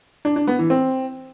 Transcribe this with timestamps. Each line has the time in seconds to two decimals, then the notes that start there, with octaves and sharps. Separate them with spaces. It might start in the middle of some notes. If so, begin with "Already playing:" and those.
0.25 D4
0.36 D4
0.47 B3
0.59 E3
0.70 C4